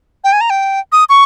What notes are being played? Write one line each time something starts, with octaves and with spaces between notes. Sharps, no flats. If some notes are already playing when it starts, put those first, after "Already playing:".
G5
G#5
A#5
G5
D#6
C#6